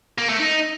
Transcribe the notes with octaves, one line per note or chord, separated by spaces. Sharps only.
A#3
A3
D#4